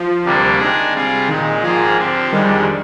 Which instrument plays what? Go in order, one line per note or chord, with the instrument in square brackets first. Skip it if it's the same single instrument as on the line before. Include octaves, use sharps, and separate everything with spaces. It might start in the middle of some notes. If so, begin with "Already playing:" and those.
Already playing: [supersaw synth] F3
[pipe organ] D2 C3 G3 A#3 D4
D#3 G#3 D4 G#4
C3 G3 C4 F4 G#4
[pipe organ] A#2 G#3 D#4 [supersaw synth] D#3
[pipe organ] G#2 D#3 A#3 F4 G#4 [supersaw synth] F3
[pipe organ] D3 F3 C4 G4
[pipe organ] F2 D3 G#3 [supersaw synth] D#3 G3